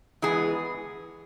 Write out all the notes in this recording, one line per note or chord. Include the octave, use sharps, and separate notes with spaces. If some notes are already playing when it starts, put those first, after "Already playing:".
E3 G#3 B3 G#4